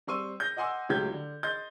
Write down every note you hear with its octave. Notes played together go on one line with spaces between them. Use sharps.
G3 C4 C6 C#6 E6 D#7
G6 A#6
D#5 F#5 G#5 C6 D6 E6
C#2 A2 F#3 G4 G6 G#6
D3
D#5 C6 G6 A6